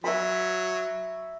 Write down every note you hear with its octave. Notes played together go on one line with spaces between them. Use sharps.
F#3 E5 B5